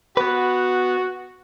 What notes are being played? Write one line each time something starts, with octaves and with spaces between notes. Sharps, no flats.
B3 F#4 B4